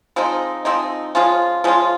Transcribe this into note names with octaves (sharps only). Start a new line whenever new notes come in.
F3 G#3 C4 D#4
F3 G#3 C4 D#4
F3 G#3 C#4 F4
F3 G#3 C#4 F4